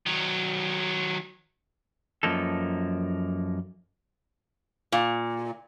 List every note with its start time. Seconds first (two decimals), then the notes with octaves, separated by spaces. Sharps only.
0.06 D#3 F#3
2.23 F#2 F3 A#3 D#4 A4
4.92 A#2